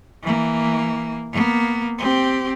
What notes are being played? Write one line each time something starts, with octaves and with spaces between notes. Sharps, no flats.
E3 A#3
A#3 B3
C4 G4